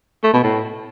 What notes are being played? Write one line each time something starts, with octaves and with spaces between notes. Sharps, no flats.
A3
B2
A2